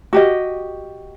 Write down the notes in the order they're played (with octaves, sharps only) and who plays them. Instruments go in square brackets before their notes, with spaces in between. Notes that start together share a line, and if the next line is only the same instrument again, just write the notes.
[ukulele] F#4 G4 D#5